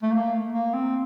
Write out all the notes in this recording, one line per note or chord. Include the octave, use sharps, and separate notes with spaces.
A3
A#3
A#3
C4